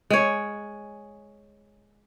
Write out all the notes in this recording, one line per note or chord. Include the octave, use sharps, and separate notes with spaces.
G#3 C#5